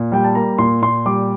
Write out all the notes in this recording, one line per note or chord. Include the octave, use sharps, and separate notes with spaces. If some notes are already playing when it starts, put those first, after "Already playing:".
Already playing: A#2
G3 G5
A5
A#3 A#5
A#2 C6
A#2 C6
G3 D6